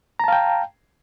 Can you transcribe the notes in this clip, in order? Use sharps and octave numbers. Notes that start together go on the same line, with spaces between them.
F5 G5 A5 A#5